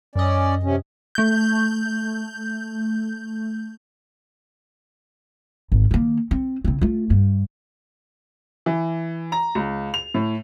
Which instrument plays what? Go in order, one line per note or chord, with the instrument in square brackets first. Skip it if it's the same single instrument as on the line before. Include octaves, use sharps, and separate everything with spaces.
[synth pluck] F#2 D#5 [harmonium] C#4 D5
[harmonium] C3 C#4
[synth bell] A3 G6
[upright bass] G#1
D#3 A#3
C4
C#3 C4
A3 F4
G2
[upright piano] E3
A#5
C#2
F7
A2